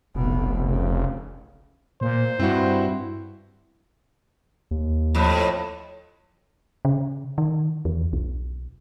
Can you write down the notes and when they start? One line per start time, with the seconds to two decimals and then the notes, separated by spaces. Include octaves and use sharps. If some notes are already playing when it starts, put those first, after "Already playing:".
0.15 F1 B1 B2
0.70 C#3
2.01 A#2 C5
2.40 G2 C4 E4 F#4
4.71 D#2
5.15 F2 A2
6.85 C#3
7.38 D#3
7.85 E2
8.13 B1